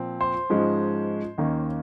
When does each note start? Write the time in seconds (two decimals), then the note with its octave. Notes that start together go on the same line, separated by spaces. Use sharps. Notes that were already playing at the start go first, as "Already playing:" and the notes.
Already playing: A#2 F3 C4
0.21 C5
0.50 G#2 F3 G#3 C#4
1.38 D#2 D#3 A#3 C#4